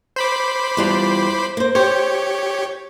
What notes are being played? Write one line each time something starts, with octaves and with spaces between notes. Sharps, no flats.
C5 B5 D6
E2 G3 F4
A#3 C5
G4 C5 C#5